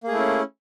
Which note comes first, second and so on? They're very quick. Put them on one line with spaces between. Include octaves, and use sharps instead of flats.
A#3 G#4 A3 E4 C#4